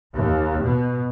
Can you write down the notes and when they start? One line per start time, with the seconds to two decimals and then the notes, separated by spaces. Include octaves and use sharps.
0.16 D#2
0.63 B2